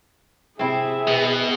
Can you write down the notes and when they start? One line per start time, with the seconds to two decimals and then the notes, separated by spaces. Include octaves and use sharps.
0.59 C3 C4 E4 G#4 E5
1.07 B2 B3